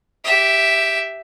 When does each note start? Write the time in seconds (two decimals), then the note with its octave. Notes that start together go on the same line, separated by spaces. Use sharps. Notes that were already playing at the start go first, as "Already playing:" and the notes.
0.25 G4 E5